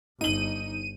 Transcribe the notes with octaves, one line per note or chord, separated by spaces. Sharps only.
G1 D#4 D#7 F#7